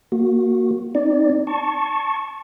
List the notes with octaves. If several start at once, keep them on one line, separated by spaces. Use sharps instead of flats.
A#3 F#4
C4 D#4 D5
A5 C#6